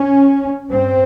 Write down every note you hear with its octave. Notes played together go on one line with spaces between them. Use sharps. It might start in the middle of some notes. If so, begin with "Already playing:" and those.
Already playing: C#4
G2 C4